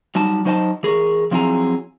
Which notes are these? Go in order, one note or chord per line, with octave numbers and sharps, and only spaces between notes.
F#3 G3 D#4 A5
F#3 D#4 C5 D#5 F#5 A5
E3 G#4 A#4 C#5
F3 F#3 C4 E4 G#4 A#5